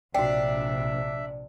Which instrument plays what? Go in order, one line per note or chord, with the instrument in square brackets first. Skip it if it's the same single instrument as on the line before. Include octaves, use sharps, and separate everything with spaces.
[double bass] A#1 C3 [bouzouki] D4 [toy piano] F#4 G5 [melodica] E5